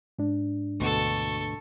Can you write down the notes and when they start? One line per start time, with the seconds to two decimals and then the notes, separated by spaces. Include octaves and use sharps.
0.19 G#2 D4
0.80 D2 B2 A4 F#5 C#6